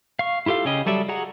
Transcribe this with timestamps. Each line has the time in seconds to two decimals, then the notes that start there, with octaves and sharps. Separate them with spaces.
0.19 F5 C#6
0.46 E4 F4 G4 A4 F5
0.65 C#3 C#4 G4 D#5
0.86 F#3 G3 A4 D5 E5
1.09 F#4 G#4 F#5 A#5